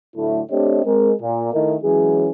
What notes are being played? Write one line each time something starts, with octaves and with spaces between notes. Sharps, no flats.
A2 D3 F#3 A3 E4
A3 C4 D4 G4 C#5 D#5
G#3 C4 A#4
A#2
D#3 A3 E4 A#4 D#5
E3 F#3 G#3 C#4 G#4